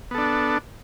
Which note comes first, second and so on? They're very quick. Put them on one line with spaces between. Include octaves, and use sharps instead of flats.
B3 A4 D4